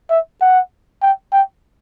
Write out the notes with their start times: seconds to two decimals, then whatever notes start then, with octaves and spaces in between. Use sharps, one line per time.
0.10 E5
0.41 F#5
1.03 G5
1.33 G5